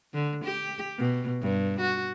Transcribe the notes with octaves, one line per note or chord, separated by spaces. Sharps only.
D3
G4
B2
G2
F#4